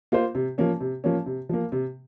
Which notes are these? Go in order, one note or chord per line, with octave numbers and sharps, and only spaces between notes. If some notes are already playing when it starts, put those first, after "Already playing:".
A#3 F4 C5
C3
F3 A#3 C#4
C3
F3 A#3 C#4
C3
F3 A#3
C3